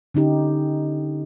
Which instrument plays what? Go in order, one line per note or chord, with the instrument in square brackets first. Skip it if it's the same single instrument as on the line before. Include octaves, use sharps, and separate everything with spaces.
[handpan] D3 C#4 D#4 G4